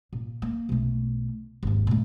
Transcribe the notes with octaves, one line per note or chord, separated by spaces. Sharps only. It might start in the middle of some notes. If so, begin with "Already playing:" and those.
A#2
A#3
B1 A3
G#1 D#2
A#2 A3